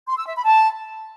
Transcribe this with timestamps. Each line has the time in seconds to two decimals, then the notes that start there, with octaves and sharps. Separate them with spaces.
0.08 C6
0.17 E6
0.26 E5
0.36 B5
0.45 A5